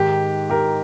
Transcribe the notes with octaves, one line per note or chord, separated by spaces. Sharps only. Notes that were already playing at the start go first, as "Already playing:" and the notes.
Already playing: G#2 D#3 G4
G4 A#4